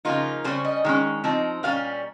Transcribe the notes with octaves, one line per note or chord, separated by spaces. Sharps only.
C#3 F3 A#3 D#4 F4
C#3 G3 C#4 C5
D#5
D#3 G#3 C#4
F3 C4 D#4
A#2 G3 C#4 F5